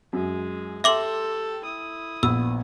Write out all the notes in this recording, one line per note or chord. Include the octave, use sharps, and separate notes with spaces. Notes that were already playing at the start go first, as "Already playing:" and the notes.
F#2 G#3
G4 A4 E5 G5 C6 D6 F#7
E4 D#6
A#1 B3 E6